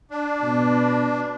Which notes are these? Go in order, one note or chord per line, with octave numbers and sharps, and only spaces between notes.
D4
B2